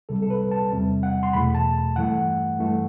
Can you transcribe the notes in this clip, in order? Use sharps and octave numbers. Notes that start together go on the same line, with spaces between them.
C2 C3 G3 A4
A4
B4
A5
E2 C3 G3
F#5
C6
E2 B2 A3 B5
A5
G2 E3 A3 F#5
G2 E3 A3